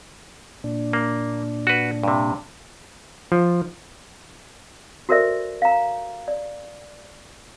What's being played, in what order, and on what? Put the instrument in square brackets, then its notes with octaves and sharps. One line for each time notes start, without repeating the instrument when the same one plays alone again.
[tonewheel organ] A#2 D4
[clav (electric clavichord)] A#3
F#4 B4
G2 C3
F3
[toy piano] F#4 A4 A#4 C5 D5 E5
F5 A#5
D5